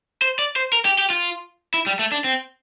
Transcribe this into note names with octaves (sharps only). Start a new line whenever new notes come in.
C5
D5
C5
A#4
G4
G4
F4
E4
G3
A3
D4
C4